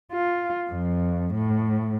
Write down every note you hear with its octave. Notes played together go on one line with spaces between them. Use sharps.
F4
F2
A2